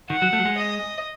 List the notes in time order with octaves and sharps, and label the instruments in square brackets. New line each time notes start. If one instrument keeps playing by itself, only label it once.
[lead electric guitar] D#3 [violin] F#5
[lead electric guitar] F#3
A3
F#3
G#3
[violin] D#5